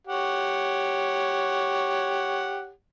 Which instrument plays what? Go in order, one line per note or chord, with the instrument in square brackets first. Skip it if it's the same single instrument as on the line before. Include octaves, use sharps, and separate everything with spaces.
[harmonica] G4 C#5 F#5